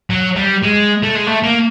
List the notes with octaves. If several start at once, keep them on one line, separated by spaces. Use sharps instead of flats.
F#3
G3
G#3
A3
G#3
A3
A#3